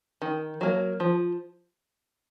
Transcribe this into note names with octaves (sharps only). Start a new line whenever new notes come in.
D#3
F#3 A#3
F3